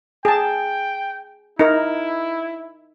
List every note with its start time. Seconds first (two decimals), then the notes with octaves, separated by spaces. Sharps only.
0.25 G#4 G5 A5
1.59 D#4 E4 A#4